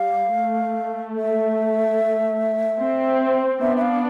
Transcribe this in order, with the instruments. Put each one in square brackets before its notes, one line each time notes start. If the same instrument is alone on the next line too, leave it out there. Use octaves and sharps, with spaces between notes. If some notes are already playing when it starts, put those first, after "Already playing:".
Already playing: [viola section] G3 [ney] F5
[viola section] A3
[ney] E5
[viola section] C4
[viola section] B3 D4 [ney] E5
[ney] E5
F5